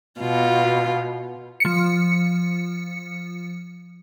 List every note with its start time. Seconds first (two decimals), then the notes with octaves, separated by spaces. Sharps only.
0.20 B2 F4
1.60 F3 C#7